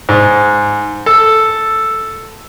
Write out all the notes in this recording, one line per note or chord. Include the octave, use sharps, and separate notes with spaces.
G#2
A4